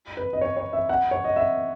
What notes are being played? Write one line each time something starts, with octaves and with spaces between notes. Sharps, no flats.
B4
D#5
C#5
C#5
E5
F#5
C#5
D#5
E5